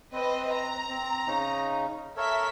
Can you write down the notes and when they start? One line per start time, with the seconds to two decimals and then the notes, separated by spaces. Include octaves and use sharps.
0.13 C4 B4 C5 D#5
0.51 A#5
0.89 C4
1.27 C#3 C#4 D#4
2.17 A4 A#4 C#5 E5 B6